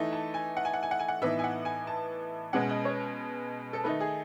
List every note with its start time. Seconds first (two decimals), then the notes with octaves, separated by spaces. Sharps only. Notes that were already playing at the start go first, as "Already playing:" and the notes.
Already playing: E3 A3 D#4
0.13 A5
0.34 G#5
0.57 F#5
0.65 G#5
0.73 F#5
0.83 G#5
0.91 F#5
0.99 G#5
1.08 F#5
1.22 A2 E3 B3 D#4 E5
1.39 G#5
1.44 F#5
1.65 G#5
1.87 A5
2.53 B2 G#3 C#4 F#5
2.69 D#5
2.85 C#5
3.73 A4
3.84 D#3 A3 D#4 B4
4.00 G#4